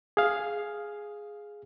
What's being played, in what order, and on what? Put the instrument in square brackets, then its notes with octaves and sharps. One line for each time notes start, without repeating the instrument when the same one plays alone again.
[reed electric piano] G#4 F5